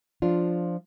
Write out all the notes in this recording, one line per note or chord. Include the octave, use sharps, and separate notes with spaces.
F3 D4 F4